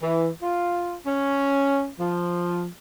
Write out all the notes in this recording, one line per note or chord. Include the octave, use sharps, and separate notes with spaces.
E3
F4
C#4
F3